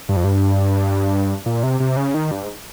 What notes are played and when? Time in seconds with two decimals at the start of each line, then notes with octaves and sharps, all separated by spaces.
0.09 G2
0.16 F2
0.24 G2
1.46 A#2
1.63 C3
1.80 C3
1.97 C#3
2.14 D#3
2.31 G2
2.43 G#2